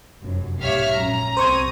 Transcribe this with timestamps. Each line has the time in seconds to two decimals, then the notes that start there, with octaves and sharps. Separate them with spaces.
0.21 F1 F#2
0.61 B1 G#2 G4 C#5 E5 F5 F6
0.92 A#1 F#2 C#4 A#5
1.37 C2 C4 C5 C#6 D#6 G#6